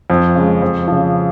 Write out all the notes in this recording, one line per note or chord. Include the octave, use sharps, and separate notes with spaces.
F2
C#3 G#3
F2
C#3 F3